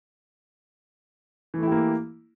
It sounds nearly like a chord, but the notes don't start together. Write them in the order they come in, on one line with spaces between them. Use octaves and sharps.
E3 A3 E4 G4 A#3